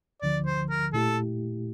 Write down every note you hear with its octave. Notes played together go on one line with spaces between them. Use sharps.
D2 D3 F3 D5
C5
A#4
A#2 A3 E4 G4 A4